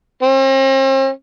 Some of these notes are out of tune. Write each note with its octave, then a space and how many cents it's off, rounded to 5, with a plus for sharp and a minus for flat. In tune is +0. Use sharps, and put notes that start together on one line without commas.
C4 +45